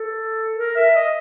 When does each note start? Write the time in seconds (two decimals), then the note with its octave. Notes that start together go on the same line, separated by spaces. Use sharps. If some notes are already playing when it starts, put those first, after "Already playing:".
Already playing: A4
0.57 A#4
0.76 E5
0.95 D#5